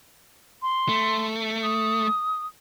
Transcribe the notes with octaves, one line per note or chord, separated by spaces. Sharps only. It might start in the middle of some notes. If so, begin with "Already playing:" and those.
C6
A3
D#6